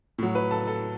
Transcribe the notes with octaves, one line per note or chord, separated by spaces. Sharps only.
A2 F#3
B4
A4 A5
A4